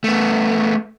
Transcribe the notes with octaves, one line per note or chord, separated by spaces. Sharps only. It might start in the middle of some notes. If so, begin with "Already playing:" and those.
A3 B3